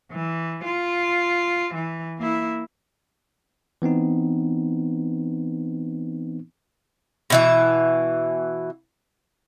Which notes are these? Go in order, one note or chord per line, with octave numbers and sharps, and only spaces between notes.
E3
F4
E3
A#3 E4
E3 B3 C4 D#4
B2 E3 E5